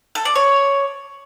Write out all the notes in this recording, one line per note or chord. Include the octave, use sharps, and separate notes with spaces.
A4
D5
C#5